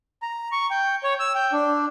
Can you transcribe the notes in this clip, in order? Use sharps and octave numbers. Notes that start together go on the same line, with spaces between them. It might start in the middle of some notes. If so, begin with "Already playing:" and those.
A#5
C#6
G5
C#5
E6
G5
D4